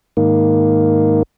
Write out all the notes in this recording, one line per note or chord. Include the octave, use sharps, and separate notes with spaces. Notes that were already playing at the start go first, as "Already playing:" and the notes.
G#2 D#3 A#3